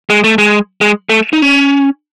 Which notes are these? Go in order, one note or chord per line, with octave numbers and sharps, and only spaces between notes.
G#3
A3
G#3
G#3
A3
D#4
C#4